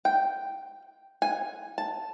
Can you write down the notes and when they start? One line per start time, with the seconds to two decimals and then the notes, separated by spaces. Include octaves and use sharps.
0.05 G5
1.22 G#5
1.78 A5